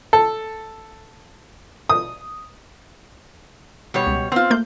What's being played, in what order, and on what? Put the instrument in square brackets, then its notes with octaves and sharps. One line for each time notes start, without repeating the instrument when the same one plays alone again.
[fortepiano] A4
D#6
[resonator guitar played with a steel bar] B2 G3 C#5
[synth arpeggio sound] C#2
[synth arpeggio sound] B3 [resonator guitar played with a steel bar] C4 F4
[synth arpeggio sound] A3 A#3 G6